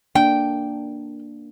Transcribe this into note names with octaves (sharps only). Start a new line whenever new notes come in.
A#3 D4 G5